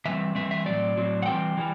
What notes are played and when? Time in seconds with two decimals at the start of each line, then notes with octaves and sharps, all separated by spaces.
0.05 E3 G3 C4 E5
0.35 E3 G3 C4 E5
0.51 E5
0.65 A2 F#3 C4 D5
0.95 A2 F#3 C4
1.22 F#5
1.26 E3 G3 C4 G5
1.57 E3 G3